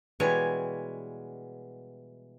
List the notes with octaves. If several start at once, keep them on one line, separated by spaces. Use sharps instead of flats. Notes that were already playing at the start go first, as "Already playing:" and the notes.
B2 E3 G3 G#3 C#5 G#5